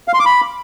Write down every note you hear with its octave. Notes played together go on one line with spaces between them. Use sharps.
F5
C6
D6
B5